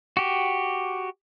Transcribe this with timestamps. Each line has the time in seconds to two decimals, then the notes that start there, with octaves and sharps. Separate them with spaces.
0.17 F#4 G4